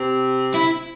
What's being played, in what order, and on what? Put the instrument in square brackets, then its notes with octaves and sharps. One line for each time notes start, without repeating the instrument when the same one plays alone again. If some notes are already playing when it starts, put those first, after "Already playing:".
Already playing: [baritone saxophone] C3
[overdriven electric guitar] E4